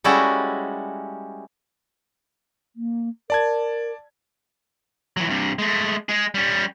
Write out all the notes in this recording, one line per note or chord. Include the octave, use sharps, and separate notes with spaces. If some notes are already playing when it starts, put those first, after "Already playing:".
G3 G#3 C#4 E4 F#4 A4
A#3
A#4 D5 A5 G#6
E3 F#3
G2 C3
G#3 A3
G#3 G#4
G3 C#4